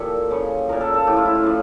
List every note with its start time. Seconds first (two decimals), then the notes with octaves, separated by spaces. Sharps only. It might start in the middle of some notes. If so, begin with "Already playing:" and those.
Already playing: A#2 F3 G4 A4 C#5
0.31 C#3 F3 C#5
0.69 A#2 F3 A#4
0.81 A4
0.94 A4
1.07 A2 F3 G4
1.16 F4
1.25 E4
1.35 F4
1.44 C#3 F3